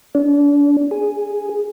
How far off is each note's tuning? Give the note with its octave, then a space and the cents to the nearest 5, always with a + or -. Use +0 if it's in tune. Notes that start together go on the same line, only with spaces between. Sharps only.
D4 -35
G#4 +0